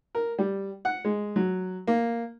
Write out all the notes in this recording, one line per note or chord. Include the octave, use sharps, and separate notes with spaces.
A#4
G3
F#5
G#3
F#3
A#3